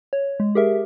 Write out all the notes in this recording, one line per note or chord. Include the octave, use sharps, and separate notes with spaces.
C#5
G#3
G4 G#4 A#4 E5